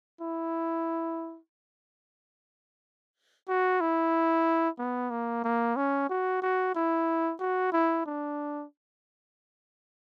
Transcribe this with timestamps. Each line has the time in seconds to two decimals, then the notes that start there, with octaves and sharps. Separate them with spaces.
0.21 E4
3.48 F#4
3.81 E4
4.79 B3
5.11 A#3
5.44 A#3
5.77 C#4
6.09 F#4
6.42 F#4
6.75 E4
7.40 F#4
7.72 E4
8.06 D4